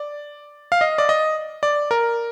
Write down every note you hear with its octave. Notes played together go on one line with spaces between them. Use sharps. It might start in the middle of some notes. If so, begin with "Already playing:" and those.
Already playing: D5
F5
D#5
D5
D#5
D5
A#4